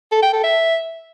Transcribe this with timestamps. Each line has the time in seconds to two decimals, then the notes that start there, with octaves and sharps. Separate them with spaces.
0.12 A4
0.22 G5
0.33 A4
0.44 E5